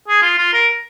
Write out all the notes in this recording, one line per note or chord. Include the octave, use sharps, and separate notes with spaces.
G#4
F4
F4
A#4